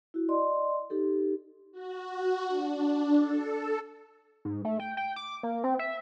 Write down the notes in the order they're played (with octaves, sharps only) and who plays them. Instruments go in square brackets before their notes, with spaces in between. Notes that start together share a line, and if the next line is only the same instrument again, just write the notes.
[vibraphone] E4 F#4
D5 D#5 C6
D#4 G4 A4
[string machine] F#4
D4
A4
[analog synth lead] G#2
A3
G5
G5
D6
A#3
C4
E5